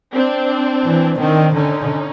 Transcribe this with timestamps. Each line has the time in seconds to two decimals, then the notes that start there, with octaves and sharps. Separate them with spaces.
0.13 C4 D4
0.85 E3
1.19 D#3 C4 D4
1.55 D3 C#4 D#4